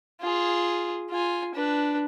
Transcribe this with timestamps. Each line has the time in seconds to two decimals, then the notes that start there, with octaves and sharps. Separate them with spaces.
0.21 F4 G#4
1.10 F4 G#5
1.55 D4 B4